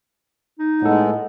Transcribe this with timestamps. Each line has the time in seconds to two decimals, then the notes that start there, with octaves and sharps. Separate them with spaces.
0.59 D#4
0.82 A2 G#3 B3 A4